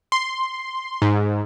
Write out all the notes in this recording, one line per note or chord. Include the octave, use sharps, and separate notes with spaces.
C6
G#2